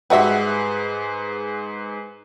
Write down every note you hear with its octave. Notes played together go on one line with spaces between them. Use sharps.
G#2 G3 F#4 G#4 B4 E5